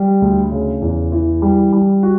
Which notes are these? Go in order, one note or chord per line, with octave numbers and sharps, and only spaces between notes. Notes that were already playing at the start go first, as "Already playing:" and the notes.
Already playing: G3
D2
C#3
E2
E3
G3
G3
F#4